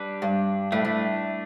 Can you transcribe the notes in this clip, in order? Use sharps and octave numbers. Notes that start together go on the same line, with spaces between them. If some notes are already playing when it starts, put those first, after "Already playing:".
Already playing: G3 D4 B4
G2
A2 A3 D4 B4
A2